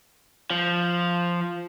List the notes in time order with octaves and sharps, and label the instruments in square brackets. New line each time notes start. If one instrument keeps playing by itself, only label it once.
[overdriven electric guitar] F3